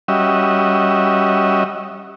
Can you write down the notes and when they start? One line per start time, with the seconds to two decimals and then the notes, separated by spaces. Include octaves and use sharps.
0.08 G3 C#4 F#4 D#5 E5